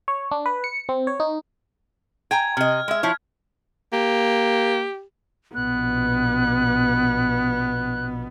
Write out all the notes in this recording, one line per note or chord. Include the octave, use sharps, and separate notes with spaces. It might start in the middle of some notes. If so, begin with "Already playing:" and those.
C#5
D4
B4
C#7
C4
C#5
D#4
G5 G#5 A#5 G#6
C3 D#5 F6
G#3 E5
F3 E4 C#5
A#3 G4
A#1 B2 B3 F#6